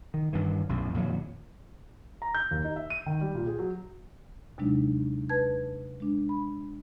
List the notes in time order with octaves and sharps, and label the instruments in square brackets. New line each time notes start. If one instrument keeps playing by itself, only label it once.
[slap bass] D#3
G2 D#3 E3
B1 F#2 A2
F2 A#2 D#3 F#3
[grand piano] A#5
G6
D#2
D#4
E5
D#7
D#3
G3
A#2
G#4
F#3
[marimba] D#2 C3 F#3 G#3 D4 D#4
B4 A5 G#6
G#3 D4
B5